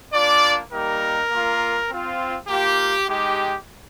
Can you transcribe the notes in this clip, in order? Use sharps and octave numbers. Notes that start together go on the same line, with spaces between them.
A#3 D4 F4 D5
G3 A#3 D#4 G4 A#4
A#3 F4
C4 F4
A#3 F4 G4
G#3 D#4 G4